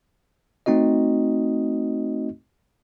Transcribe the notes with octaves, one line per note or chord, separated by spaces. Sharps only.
A3 C4 D#4 F#4 D#5